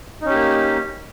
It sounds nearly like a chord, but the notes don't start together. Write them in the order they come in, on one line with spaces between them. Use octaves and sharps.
D#4 C#4 G4 A#3